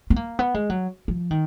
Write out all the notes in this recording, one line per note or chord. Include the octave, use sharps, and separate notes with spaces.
B3
A#3
B3
G#3
F#3
F3
D#3